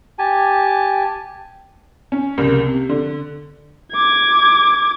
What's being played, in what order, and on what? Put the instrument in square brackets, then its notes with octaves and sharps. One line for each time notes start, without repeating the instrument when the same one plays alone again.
[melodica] G4 G#5 A5
[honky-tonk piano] C#4
C2 C#3 A#3
C3
D3
[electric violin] D6 G#6